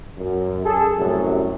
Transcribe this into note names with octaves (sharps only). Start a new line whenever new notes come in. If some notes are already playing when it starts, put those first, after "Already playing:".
F#2
G#4 A4
F#2 A2 C3 G3